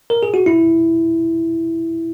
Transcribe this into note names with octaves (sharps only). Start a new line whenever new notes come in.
A#4
G#4
F#4
E4